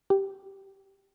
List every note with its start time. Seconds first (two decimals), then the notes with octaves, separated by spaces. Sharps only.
0.10 G4